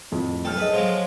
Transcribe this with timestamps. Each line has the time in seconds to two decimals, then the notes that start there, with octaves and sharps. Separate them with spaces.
0.12 F2 A2
0.45 B1 A4 G5 F6
0.57 G#4 A4 B4 D#5
0.73 F3 F#3 G#3